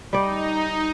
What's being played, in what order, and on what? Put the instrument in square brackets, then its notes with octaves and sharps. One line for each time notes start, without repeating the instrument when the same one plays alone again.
[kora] G3 D5 [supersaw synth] D#4